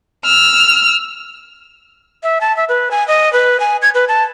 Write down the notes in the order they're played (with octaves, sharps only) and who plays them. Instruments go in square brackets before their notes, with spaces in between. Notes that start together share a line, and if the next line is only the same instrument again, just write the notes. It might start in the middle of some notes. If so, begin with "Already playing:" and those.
[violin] E6 F6
[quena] E5
A5
E5
B4
G#5
D#5
B4
G#5
G#6
B4
A5